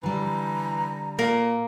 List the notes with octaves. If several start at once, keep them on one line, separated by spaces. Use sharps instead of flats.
D3 E3 G3 A#5
A#2 A#3